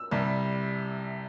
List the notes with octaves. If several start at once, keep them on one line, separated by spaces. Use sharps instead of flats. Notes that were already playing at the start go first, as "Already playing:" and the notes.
Already playing: E6
C2 C3 G3